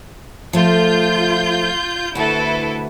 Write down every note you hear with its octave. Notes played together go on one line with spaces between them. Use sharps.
F3 A3 F4 G6
D2 E4 F#4 A4 B4